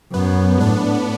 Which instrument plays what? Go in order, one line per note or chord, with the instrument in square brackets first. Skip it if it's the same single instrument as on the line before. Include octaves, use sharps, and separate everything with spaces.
[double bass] F#2 [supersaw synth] B3
[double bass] A2 [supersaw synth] D4